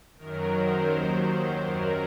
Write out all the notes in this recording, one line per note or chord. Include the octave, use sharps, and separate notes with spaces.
F#2 D#3 F#3 A#4
C5
D#2 D#3 F#3 C5
F#2 F#3 A#4